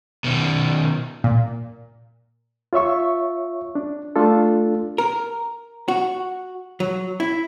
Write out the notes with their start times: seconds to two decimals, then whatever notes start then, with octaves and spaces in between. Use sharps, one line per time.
0.24 B2 D#3
1.24 A#2
2.73 F4 C#5 E5 C#6
3.75 D4
4.16 A3 D4 F4 A4
4.98 A#4
5.88 F#4
6.80 F#3
7.20 E4